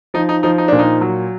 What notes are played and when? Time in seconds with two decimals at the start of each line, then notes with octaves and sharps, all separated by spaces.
0.14 F3 D#4
0.29 D#4
0.43 F3 D#4
0.58 D#4
0.68 A#2 D4
0.79 D#4
1.01 F#3